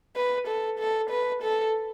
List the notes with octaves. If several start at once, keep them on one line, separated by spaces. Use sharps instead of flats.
B4
A4
A4
B4
A4